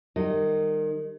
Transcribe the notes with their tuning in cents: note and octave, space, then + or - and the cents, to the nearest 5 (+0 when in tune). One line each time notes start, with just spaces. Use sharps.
D#3 -30 G3 +0 D#5 +0